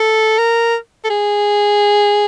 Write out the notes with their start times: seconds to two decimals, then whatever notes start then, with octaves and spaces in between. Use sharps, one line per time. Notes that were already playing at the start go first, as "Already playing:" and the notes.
Already playing: A4
0.38 A#4
1.04 A4
1.10 G#4